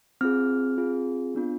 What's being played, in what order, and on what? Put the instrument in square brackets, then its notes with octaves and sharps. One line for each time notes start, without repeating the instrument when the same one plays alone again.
[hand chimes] C4 F4 G#4 F6
C4 F4 G#4
B3 D4 F4